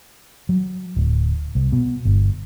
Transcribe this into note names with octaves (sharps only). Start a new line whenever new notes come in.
F#3
D1
C2
B2
G1